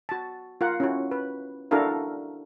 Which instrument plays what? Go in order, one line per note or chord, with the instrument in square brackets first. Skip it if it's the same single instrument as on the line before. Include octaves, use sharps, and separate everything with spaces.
[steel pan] F#4 A5
F4 A#4 F#5
C#4 E4 F#4
B4
D4 E4 F#4 A4 A#4 F5